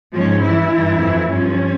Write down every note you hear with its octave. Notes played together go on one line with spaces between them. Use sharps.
G#2 F3 C#4
G2 E3 E4
G2 E3
F2 E3
G2 F3 C#4